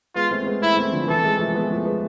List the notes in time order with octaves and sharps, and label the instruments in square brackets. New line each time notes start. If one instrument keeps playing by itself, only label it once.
[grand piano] G#3 B3 [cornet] F4
[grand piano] A3 C4
G#3 B3
[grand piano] A3 C4 [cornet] E4
[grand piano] A3 C4
D3 F3
[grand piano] C3 E3 [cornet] A4
[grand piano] E3 G#3
F3 A3
G#3 B3
F3 A3
G#3 B3